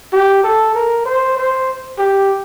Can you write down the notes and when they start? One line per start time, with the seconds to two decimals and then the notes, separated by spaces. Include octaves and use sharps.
0.13 G4
0.44 A4
0.75 A#4
1.06 C5
1.37 C5
1.98 G4